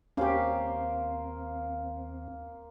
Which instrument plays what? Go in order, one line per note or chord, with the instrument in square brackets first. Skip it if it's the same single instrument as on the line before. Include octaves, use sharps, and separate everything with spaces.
[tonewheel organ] D#2 C4 [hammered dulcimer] A#3 C5 F5 [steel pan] C#4 G4